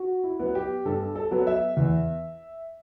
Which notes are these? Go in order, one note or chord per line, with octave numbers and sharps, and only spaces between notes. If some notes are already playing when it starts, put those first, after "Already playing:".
Already playing: F#4
E4
F#3 B3
G4
G2 A4
A4
F#3 B3
E5
E2